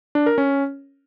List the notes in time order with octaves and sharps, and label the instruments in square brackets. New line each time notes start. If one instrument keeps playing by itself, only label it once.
[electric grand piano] D4
A#4
C#4